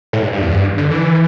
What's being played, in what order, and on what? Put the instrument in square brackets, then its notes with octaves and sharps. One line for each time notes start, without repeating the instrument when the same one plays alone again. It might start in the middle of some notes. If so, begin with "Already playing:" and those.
[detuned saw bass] A2
G2
G2
E2
G2
D3
E3